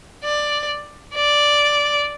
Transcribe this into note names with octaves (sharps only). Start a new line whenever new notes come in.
D5
D5